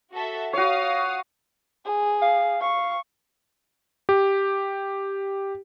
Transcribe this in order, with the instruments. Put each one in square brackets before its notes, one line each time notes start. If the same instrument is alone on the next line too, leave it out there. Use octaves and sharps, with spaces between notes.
[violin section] F#4 A4 E5
[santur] F#4 C#5 [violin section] F5 D#6
[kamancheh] G#4
[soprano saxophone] F5
[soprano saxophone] F5 [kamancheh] C#6
[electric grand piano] G4